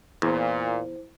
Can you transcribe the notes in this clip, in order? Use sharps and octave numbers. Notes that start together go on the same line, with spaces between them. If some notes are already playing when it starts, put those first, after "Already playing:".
E2 A#2 E4 C5